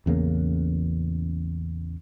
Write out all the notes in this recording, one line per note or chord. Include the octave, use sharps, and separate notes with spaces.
A1 E2 C#3 A#3